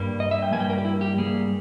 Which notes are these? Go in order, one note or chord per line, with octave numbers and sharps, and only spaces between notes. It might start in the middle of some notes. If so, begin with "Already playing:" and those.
Already playing: G2 G3 A#3
D#5
E5
G5
G2 G3 A#3 G#5
G5
A#4
G4
E4
G4
G2 G3 A#3 G#4